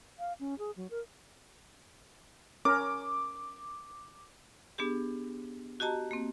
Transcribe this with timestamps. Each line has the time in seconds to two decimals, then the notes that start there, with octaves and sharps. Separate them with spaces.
0.19 F5
0.40 C#4
0.59 G#4
0.76 F#3
0.90 A#4
2.65 C#4 A#4 D6
4.78 B3 D4 G4 G#4
5.80 F#4 G4 D#5 A5 A#5
6.11 A#3 C4